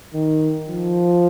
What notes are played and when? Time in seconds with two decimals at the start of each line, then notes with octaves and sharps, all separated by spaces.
0.14 D#3
0.68 F3